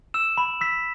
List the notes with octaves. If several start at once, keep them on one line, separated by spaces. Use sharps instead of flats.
E6 E7
B5
E6 B6